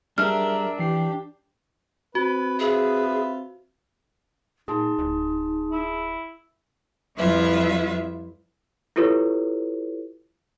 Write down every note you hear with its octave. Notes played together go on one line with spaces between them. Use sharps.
G3 D4 G#4 A#4 E5 F6
E3 G4 C7
C4 F#4 B4
F4 G#4 B4 E5
A#2 D#4 G#4 A5 C6
D1
E4
F2 G3 E4 F4 B4 E5
E4 F4 G4 A4 B4 C#5